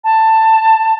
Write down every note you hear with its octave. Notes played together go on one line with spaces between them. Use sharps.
A5